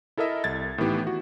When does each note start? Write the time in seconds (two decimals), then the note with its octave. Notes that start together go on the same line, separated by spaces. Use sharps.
0.17 E4 A4 A#4 D#5 E5
0.44 C2 G#6 A6
0.78 A2 D#3 E3 B3 G4
1.07 F#4